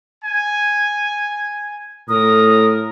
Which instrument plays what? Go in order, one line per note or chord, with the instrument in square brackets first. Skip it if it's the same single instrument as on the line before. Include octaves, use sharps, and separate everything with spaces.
[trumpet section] G#5
[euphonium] A2 [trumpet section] A#4 [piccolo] D#6